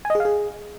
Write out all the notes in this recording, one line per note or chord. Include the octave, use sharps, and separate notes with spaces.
G#5
D#5
G#4
F5
G#4